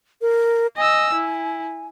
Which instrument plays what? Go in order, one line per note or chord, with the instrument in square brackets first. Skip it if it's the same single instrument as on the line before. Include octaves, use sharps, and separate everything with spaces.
[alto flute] A#4
[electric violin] D#5 E6 [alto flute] G#5
[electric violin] E4